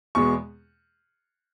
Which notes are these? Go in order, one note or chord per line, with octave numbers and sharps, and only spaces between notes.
E2 B2 G#3 B3 C#6